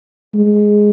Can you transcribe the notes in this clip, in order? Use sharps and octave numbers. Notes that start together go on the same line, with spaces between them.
G#3